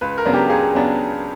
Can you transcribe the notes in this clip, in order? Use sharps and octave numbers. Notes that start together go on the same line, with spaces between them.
C#2 B4
A#4
C#3 F#3 B3 D4
G4
C#2 G#4
C#3 F#3 B3 D4